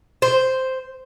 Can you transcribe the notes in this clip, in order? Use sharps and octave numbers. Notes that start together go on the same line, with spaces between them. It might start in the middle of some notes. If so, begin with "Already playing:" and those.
C5